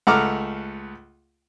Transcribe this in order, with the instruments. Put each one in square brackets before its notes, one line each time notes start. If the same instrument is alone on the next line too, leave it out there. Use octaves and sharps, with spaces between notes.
[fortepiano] C#2 A3 F#5 A#5 D6 F6